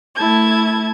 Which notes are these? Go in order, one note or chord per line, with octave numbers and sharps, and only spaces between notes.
A3 E4 A5 G#6